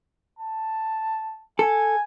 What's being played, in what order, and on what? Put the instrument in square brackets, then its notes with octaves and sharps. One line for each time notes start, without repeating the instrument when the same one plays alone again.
[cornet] A5
[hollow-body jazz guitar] A4 [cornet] G#5